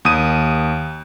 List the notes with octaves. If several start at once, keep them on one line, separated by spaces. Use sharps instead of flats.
D#2 D#6 D#7